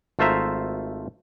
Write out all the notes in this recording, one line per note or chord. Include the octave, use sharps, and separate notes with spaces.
G#1 A3 F4 C5 E5 A#5